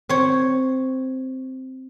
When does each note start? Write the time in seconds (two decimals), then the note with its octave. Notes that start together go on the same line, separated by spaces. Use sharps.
0.09 C4 C#5